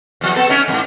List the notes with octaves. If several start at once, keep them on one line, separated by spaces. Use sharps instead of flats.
E2 F3
B3 A4
A3 C#4 D#4
F2 G#2